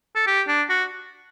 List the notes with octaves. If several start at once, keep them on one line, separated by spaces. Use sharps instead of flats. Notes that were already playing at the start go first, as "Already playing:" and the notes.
A4
G4
D4
F#4